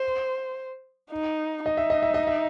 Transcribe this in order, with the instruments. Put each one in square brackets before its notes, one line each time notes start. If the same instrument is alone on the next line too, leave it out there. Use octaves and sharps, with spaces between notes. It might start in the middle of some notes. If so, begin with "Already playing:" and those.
Already playing: [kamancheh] C5
D#4
[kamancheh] D#4 [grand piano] D#5
[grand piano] E5
D#5
E5
D#5
E5